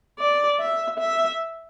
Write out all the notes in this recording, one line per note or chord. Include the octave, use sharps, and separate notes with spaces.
D5
E5
E5